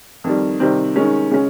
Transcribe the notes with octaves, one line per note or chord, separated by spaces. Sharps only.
F2 D#3 G3
C3 D#3 G3 C4
D#3 G#3 C#4
C#3 G#3 C#4